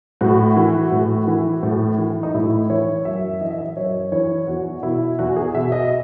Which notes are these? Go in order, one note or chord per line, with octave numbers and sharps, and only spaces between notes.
A2 F#4
E3
A2
E3
A2
E3
D#4
A2 E4
E3 C#5
F#2 E5
E3 D#5
E5
D#5
F#2 C#5
E3 C#5
E2 F#4
B2 E4
E2 F#4
G#4
B2 E5
D#5